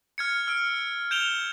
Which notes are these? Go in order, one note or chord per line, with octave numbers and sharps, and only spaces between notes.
F6 G#6 C#7
E6 F6 D7
G6 D7 E7 F7 G7